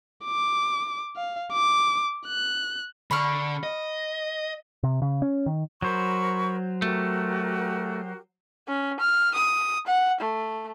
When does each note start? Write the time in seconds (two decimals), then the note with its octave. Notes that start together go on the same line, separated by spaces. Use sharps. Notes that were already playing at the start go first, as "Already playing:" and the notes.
0.24 D6
1.17 F5
1.53 D6
2.27 F#6
3.11 D3 B5 C#6 F6
3.63 D#5
4.83 C3
5.02 C#3
5.22 C#4
5.46 D#3
5.82 F#3 A#4 C5 B5 C#6
6.82 A3 F#4 G4 A#4
8.68 C#4
9.00 F6
9.35 D#6
9.87 F#5
10.21 A3